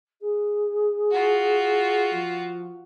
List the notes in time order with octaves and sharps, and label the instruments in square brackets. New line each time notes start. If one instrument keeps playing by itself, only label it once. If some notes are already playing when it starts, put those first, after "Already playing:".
[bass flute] G#4
[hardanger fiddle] F4 F#4
[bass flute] F3